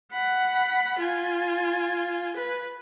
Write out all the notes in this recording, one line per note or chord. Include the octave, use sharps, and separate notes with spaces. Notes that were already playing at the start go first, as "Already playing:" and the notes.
F#5 B5
F4 G#5
B4